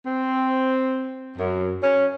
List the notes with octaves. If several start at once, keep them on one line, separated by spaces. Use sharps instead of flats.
C4
F#2
C#4